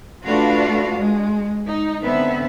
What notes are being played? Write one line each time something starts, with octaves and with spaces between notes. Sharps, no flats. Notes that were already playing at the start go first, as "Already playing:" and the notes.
A3 D4 F4 F#4 B4 F5
G#3
D#4
D3 B3 C4 E5